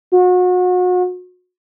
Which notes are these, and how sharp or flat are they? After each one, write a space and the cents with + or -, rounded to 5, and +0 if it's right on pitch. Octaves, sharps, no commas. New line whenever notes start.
F#4 -35